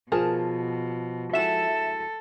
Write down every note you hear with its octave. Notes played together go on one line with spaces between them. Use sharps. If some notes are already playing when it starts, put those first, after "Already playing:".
B2 F3 G#4 A#4 A5
G#3 E4 F#4 A4 E5 E7